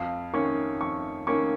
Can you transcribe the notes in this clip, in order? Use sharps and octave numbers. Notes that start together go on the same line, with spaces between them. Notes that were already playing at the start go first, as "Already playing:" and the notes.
Already playing: F2 F5
D#3 A#3 C#4 C#6
F2 C#6
D#3 A#3 C#4 C#6